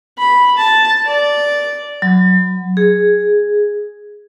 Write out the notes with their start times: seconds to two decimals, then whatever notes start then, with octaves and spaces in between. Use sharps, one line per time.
0.18 B5
0.57 A5
1.06 D5
2.02 F#3
2.77 G#4